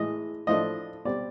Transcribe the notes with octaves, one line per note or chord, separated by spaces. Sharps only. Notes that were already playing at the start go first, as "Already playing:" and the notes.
Already playing: A2 E3 G#3 D#5
A2 F3 A3 D4 D#5
B2 G3 C4 D5